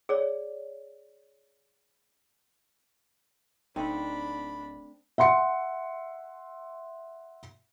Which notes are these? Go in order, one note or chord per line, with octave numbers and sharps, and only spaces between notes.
G#4 C#5 D5
D1 A3 C4 D4 D#4 B5
E5 F#5 C6 C#7